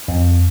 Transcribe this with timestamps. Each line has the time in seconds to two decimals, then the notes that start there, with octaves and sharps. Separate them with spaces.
0.08 F2